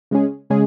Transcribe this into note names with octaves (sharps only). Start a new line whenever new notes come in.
C#3 G#3 C#4 G#4
C#3 G#3 C#4 G#4